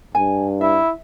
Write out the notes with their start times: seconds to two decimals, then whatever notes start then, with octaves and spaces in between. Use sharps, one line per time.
0.15 G2 G#5
0.61 E4 E5